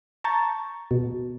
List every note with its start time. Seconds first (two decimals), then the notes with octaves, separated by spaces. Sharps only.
0.24 A5 A#5 C#6 G6 A6
0.91 B2